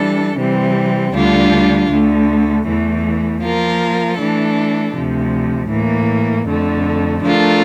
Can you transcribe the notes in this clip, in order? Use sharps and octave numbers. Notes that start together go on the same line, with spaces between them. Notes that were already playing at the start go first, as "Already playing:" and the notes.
Already playing: E3 G3 D4 A4
C3 E3 G3 C4
D2 D3 G3 D4 F4
D2 D3 A3
E2 E3 A3
F3 A#3 F4 A#4
E3 A3 D4 A4
D2 C3 F3
A2 E3 A#3
F2 D3 A3
F3 A3 D4 F4 A#4